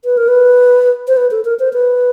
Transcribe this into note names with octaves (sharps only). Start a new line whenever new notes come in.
B4
A#4
B4
C5
B4
A4
A#4
C5
B4